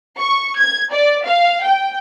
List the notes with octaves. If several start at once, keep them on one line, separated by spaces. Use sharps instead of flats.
C#6
G#6
D5
F5
G5